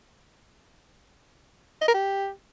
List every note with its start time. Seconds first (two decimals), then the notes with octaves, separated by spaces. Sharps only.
1.82 D#5
1.88 A#4
1.94 G4